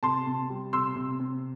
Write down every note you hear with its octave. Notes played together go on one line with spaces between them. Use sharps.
C3 A5 C6
C3
G3
C3 C6 E6
C3
C3